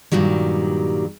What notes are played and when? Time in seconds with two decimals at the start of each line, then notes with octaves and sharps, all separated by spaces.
0.12 G2 A#2 D#3 F#3 G3